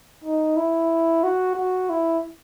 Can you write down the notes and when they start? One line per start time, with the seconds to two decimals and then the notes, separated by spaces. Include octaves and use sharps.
0.24 D#4
0.57 E4
1.24 F#4
1.56 F#4
1.89 E4